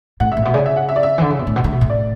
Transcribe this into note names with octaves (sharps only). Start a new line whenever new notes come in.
A2 F#5
E5
A2
B2 E5
C#3 D5
E5
F#5
E5
D5
E5
E3
D3
C#3
B2
A2
B2
D3
B2
A2
D5